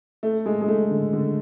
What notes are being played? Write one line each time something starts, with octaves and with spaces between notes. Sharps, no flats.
A3
G#3
G#3
A3
D3
D3